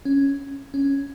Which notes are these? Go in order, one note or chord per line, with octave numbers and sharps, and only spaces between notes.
C#4
C#4